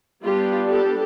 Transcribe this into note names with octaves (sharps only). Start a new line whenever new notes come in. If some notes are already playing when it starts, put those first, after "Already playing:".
G3 B3 D4 F4 G4
G4 A4